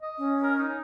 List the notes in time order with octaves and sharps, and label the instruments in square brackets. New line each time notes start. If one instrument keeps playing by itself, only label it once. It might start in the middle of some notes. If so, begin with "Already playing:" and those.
[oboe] D#5
[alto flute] C#4
[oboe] A#4
D#4